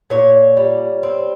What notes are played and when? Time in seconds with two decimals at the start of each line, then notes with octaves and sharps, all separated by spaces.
0.10 A#2 C#5
0.57 G3
1.03 C4